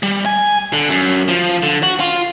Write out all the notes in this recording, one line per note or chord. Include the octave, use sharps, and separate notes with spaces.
G3
G#5
D3
F#2
F3
D3
F#4
F4